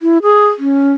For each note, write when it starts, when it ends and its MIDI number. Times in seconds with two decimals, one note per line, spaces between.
0.02 0.18 64
0.23 0.47 68
0.59 0.93 61